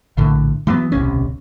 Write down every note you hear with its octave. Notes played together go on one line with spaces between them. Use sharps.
A#1 A2 D3
E3 F#3 A3 B3
D1 B1 C3 C#4